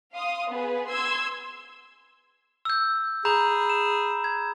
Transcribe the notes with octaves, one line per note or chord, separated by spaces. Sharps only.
F5 C6 D#6
B3 G#4 B4
C6 E6 G#6
E6 G6
G#4 A#5 B5 G6
E7
G#6